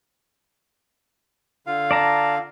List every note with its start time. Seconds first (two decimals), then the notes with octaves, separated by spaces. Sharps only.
1.67 D3 F4 F5
1.91 D5 A5 A#5